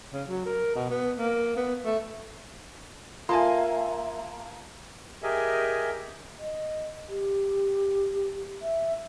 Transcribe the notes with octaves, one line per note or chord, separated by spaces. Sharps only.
C#3
F#3
A#4
B2
B3
A#3
B3
A3
A#3 F4 E5 F5 G#5 A5 C6
G4 G#4 A#4 D#5 E5 G#5
D#5
G4
E5